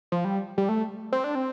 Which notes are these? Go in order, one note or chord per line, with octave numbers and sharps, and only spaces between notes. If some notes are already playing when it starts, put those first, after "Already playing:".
F3
G3
G3
A3
C4
D4
C4